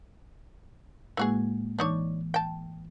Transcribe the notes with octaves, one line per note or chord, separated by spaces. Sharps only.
A2 E3 G#3 A#3 F#4 G#4
E3 D4 D#4 C#5 D6
G5 A5